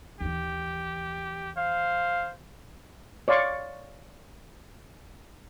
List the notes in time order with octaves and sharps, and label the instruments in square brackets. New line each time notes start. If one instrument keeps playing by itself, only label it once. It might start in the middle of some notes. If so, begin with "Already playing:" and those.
[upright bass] D#2 E3 [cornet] G4
[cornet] C5 [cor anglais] F5
[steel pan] C#5 D5 F5 C6 C#6